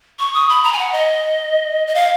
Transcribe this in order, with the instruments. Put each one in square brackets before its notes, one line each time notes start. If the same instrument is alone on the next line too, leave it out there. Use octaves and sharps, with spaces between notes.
[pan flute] C#6
D#6
B5
A#5
G#5
F#5
D#5
D#5
F5